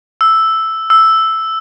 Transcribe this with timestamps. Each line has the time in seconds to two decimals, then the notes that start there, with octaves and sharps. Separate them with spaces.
0.21 E6
0.90 E6